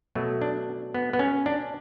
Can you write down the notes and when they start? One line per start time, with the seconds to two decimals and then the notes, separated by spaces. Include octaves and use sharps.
0.15 B2 F#3 A3
0.41 D4
0.94 B3
1.13 B3
1.19 C#4
1.46 D4